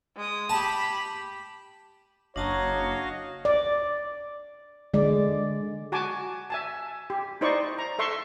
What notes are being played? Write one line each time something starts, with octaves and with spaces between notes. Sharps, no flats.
G#3 D#6
G4 A5 B5
F#1 D4 F#4 C#5 D#5 F5 A5 A#5
D5
D3 G#3 D5
F#4 G#5 A5 D6
E5 G#5 A5
G4
D#4 E4 C5 D5 D#5 C#6
A#5
A4 E5 C6 C#6